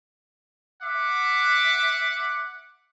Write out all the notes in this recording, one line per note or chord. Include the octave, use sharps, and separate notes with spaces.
E5 F#5 D6